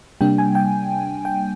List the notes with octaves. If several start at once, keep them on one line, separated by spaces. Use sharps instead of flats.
C3 G3 A#3 D4 G5
G#5
G5
G5